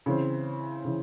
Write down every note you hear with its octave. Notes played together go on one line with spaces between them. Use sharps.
C#3 E3 C4
C#3 E3